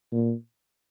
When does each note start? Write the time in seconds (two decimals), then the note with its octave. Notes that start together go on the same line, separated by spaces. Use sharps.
0.12 A#2